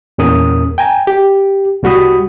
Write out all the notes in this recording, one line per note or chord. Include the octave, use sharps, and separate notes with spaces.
E2 A#2 C#4 A#4 D#6
G5 G#5 A#5
G4
C2 G3 F#4 B5 D#6